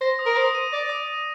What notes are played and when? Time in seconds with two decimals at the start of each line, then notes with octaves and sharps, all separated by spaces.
0.01 C5 A#6
0.19 D#6
0.26 A#4
0.36 C5 D#6
0.55 D#7
0.72 D5 A#6
0.90 D#6
1.08 D#6